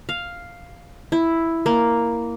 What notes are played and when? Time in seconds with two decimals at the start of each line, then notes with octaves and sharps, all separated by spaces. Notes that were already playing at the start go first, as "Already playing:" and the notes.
0.09 F5
1.12 E4
1.66 A#3